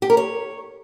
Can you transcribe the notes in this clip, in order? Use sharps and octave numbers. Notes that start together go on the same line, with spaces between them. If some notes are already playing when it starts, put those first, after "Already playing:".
G4
A#4
C#5